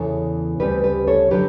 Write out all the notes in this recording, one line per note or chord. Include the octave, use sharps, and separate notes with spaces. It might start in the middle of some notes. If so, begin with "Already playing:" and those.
Already playing: E2 C#3 E3 A4 C#5
D2 C#3 G3 G4 B4
G4 B4
A4 C#5
D3 F#3 G4 B4